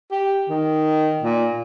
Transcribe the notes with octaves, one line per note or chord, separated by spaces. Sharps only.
G4
D#3
A#2